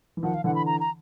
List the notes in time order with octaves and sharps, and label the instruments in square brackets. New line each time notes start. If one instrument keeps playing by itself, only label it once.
[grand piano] E3
[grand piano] D#3 F3 [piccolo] F#5
[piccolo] F5
[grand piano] D3 E3 [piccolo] F#5
[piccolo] B5
A#5
A#5